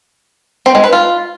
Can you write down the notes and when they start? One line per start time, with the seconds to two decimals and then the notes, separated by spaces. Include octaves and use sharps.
0.66 C4
0.75 G#3
0.84 B4
0.93 F4